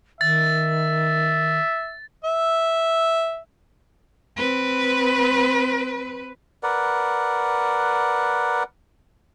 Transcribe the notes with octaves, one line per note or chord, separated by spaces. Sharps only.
D#3 E5 A6
E5
C4 B4
A#4 B4 D5 F#5